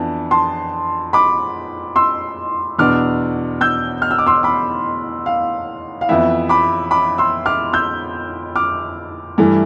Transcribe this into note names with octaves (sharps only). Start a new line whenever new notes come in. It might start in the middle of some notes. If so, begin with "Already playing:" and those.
Already playing: F2 E3 B3 D4 A5
A5 C6
B5 D6
C6 E6
E2 B2 B3 D4 D6 F6
E6 G6
F6
E6
D6
C6 E6
B5 D6
F5
F5
F2 E3 B3 E4 E5
B5 D6
B5 D6
C6 E6
D6 F6
E6 G6
D6 F6
G2 E3 A3 E4